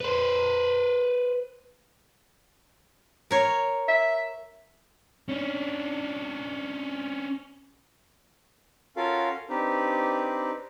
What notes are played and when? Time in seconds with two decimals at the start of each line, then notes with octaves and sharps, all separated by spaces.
0.01 B4 C5
3.31 A#4 C#5
3.88 E5
5.29 C#4 D4
8.96 C#4 F4 F#4 A4 A#4 F5
9.49 C4 D4 D#4 G4 B4